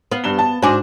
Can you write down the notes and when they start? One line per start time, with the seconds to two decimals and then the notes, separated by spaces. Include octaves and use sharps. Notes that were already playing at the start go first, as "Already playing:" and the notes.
0.11 B3 F5
0.24 G2 E7 G7
0.39 A5
0.62 G#2 D4 F#4 C5 G#5 D6